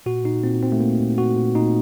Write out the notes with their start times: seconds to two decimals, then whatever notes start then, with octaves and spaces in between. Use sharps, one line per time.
0.06 A#2 F#4
0.24 A#2 D#4
0.44 A#2 C4
0.62 A#2 C4
0.72 A3
0.80 A#2 A#3
1.00 A#2
1.18 A#2 F#4
1.37 A#2
1.55 A#2 D#4